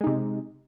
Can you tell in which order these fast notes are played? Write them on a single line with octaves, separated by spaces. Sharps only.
G#3 D#4 C3